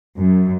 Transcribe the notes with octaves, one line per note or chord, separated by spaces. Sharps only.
F#2